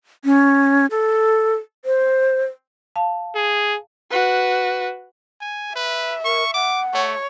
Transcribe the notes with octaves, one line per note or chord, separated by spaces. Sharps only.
C#4
A4
C5
F5 A5
G#4
F#4 B4
G#5
B4 E5
A#4 C#6
F#5 D6
A3 C#5